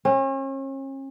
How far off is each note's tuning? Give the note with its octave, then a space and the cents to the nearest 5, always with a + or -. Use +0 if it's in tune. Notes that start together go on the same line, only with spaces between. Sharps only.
C#4 -40